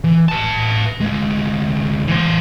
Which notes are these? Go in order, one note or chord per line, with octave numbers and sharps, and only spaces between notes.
E3
B4 A5
D2 G#3
E3 C5